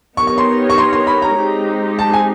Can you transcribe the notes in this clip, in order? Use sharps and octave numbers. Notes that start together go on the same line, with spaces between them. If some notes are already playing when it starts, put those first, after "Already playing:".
B3 D#4 G4 A#4 C#5 C#6
C#6
C6
C#6
C6
C6
B5
A#5
G#3 C4 D#4 G4
A5
G#5